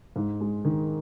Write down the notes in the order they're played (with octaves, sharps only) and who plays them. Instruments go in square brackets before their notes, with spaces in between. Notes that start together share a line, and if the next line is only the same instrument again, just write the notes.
[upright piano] G#2
G#3
D#3